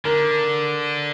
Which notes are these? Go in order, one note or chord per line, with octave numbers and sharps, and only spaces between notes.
D3 A#4